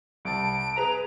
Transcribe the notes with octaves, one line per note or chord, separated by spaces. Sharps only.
C2 A5 D7
G#4 B4 A#5 F7